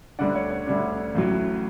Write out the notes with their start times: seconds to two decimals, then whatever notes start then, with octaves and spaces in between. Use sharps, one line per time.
0.19 D2 D3 G3 D4 D5 F#5
0.35 C#5
0.50 C#5
0.67 D2 D3 G3 D4
1.15 A1 A2 F#3